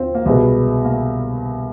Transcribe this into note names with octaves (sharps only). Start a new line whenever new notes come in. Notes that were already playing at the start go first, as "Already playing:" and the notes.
Already playing: D#2 C4 F4
A#3
C2 B2 G#3 B3
A#3